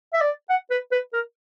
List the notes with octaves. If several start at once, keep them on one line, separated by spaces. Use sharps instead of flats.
E5
D5
F#5
B4
B4
A#4